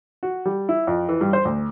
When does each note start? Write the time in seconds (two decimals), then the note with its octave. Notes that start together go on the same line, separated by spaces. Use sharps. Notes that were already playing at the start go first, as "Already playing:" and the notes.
0.23 F#4
0.45 G3
0.69 E4
0.87 F2
1.09 E3
1.21 G2
1.33 C5
1.45 D2